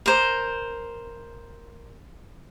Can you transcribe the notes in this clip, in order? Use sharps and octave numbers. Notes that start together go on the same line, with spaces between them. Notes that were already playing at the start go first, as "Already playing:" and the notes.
A#4 C5